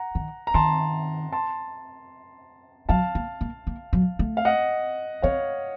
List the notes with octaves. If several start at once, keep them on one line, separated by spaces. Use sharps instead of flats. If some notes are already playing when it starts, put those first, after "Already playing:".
Already playing: F#5 A#5
D#3
A#5
D#3 A5 C6
A5 C6
F#3 F5 A5
A#3
A#3
A#3
F#3
A3
F5
D#5 F#5
C4 C#5 F5